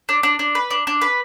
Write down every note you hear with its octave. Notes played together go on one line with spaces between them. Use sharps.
D4
D4
D4
B4
D4
D4
B4